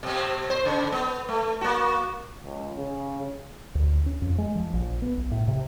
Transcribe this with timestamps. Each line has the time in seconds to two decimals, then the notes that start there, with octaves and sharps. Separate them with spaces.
0.03 B2 C4
0.50 C5
0.65 C#3
0.92 B3
1.29 A3
1.61 A#3 F#4
2.42 C#2
2.76 C#3
3.75 D2
4.06 C#4
4.22 F2
4.38 G#3
4.55 F3
4.73 A#1
5.02 B3
5.17 B1
5.31 A2
5.48 C3